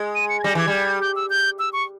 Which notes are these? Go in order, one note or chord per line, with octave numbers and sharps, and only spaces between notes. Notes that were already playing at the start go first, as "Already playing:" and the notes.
Already playing: G#3
D#7
C#7
G#6
G3 A#6
E3 G#6
G3
G6
E6
G6
E6
C#6